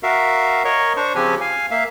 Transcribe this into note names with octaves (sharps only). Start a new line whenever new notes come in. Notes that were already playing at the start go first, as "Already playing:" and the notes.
F#4 A#4 E5 F5
A#4 C#5 D#5 C#6
D4 C5 C#6
C#3 F3 C4 C#4 G4 G#5
F5 G#5
A#3 E5 F5